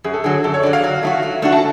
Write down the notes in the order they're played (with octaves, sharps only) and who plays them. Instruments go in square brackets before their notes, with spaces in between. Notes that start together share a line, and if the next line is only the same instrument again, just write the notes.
[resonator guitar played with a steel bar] F#2 [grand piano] G#4
[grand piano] A4
[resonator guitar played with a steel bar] D3 F#3 [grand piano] G#4
[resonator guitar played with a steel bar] F#2 [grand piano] A4
[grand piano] C#5
[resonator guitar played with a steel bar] D3 [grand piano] D5
[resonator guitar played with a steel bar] F#3
[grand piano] F5
[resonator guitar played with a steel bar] F#3
A3 D4 F#4
F#3
A3 D4 F#4
[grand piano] A5